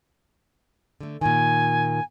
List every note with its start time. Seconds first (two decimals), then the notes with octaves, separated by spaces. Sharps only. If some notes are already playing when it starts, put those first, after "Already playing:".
1.01 D3 A3
1.21 A#2 D#3 G#5